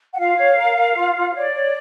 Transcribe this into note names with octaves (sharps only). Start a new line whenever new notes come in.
F#5
F4 F5
C#5
A#4
A#4
F4
F4
C#5 D5
C#5